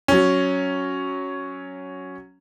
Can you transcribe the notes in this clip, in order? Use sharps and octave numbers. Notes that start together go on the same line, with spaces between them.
F#3 C#4